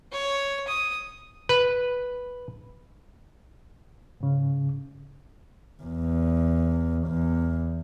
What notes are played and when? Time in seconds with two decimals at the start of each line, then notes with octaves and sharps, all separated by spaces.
0.12 C#5
0.68 D#6
1.49 B4
4.21 G#2 C#3
5.83 E2
7.07 E2